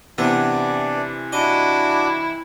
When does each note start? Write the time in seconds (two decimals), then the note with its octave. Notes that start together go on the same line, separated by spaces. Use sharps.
0.18 C3 E3 B3 D4 D5
1.32 D4 E4 F#4 D#5 D6